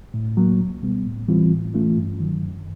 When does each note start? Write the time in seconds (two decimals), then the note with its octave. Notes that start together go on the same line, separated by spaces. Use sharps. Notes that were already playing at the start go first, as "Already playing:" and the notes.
0.14 A2
0.37 F#3 A#3
0.60 C#2
0.82 B2 G3 B3
1.05 A2
1.28 E3 G3 C4 F4
1.51 A2
1.74 E3 A3 C#4 F4
1.97 G2
2.20 D#3 F#3
2.43 F#2